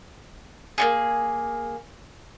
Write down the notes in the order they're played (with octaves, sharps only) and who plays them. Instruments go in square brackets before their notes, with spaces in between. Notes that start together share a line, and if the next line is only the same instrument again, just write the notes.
[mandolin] A#3 D#4 G#4